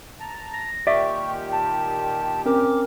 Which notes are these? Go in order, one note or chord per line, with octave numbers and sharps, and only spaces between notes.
A5 A#5
A#6
A#2 D#3 G4 D5 E5 C#6
A5
C4 C#4 A#4 D6